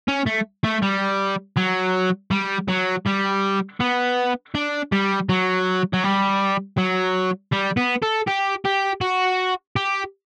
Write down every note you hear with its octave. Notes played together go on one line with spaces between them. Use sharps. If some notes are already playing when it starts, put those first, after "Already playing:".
C#4
A3
A3
G3
F#3
G3
F#3
G3
B3
D4
G3
F#3
F#3
G3
F#3
G3
B3
A4
G4
G4
F#4
G4